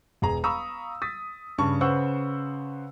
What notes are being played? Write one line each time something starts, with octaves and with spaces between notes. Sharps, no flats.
E1 G#4 A#5
F5 A#5 B5 C#6 D#6 E6
D#6 A6 B6
G2 C#3 A5 C#6
C#3 B4 C5 F#5 C#6 E6